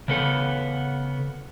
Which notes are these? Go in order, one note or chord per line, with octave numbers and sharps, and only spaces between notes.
C#3 B3 A4